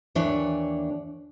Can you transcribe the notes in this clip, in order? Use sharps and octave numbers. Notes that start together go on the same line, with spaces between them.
D#2 E3 D4 C#5